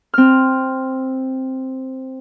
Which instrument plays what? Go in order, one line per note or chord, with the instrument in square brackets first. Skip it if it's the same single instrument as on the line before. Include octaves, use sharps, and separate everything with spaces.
[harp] C4 F6